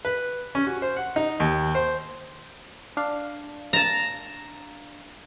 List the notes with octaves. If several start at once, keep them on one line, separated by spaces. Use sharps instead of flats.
B4
C#4
F#4
C5
F#5
D#4
D#2
C5
D4 F5
A5 A#5